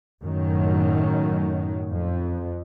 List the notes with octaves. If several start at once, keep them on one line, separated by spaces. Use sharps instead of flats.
F#2 A2 D#3 F#3
F2